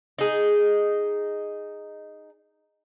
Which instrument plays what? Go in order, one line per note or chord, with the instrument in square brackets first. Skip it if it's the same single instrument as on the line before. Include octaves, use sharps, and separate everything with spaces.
[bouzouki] D#4 G#4